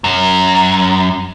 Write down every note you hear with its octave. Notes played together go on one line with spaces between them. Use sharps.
F#2